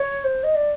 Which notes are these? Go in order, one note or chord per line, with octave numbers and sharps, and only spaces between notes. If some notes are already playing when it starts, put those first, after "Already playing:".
Already playing: C#5
C5
D#5
D5